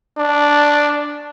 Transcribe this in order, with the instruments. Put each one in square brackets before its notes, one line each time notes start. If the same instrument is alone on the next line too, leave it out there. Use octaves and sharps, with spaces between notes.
[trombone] D4